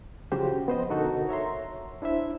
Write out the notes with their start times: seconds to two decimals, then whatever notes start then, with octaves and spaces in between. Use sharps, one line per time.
0.32 C#3 F3 F#4 G4 C5
0.68 B3 C5 D#5
0.89 B2 D3 D#4 F#4 A4 A#4
1.29 C#5 E5 A#5 C6
2.02 D4 E4 C5 E5